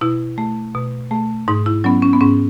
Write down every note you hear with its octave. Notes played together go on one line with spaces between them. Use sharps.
B2 E4
A3
B2
A3
G#2 D#4
E4
F#3 B3 C#4
C#4
B3
G#2 C#4